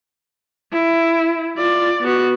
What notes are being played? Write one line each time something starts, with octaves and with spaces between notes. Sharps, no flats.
E4
F4 D5
B3 F#4